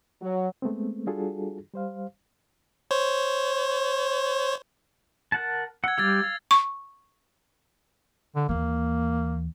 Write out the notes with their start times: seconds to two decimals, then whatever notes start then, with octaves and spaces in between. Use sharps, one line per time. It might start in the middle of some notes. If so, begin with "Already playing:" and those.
0.22 F#3
0.62 G#3 A3 B3 C4
1.07 G3 D4 F4 F#4 G#4 A4
1.74 G3 C5 F5
2.91 C5 C#5
5.32 A#4 F#5 A5
5.84 F#5 E6 G#6
5.98 G3 G4 F5 E6 G#6 A6
6.24 F5
6.51 C#6
8.35 D3
8.49 D#2 E3 A#3